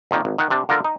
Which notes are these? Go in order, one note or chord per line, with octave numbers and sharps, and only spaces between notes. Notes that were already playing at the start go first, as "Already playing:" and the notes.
F2 A#2 D#3
G#1
D#3 F#5
C3 D4
D3 F4 A4 A#4
D#4